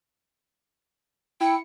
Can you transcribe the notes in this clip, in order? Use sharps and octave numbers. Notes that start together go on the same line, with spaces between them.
E4 G5 C#7